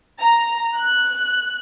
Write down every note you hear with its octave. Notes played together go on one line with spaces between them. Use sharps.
A#5
F#6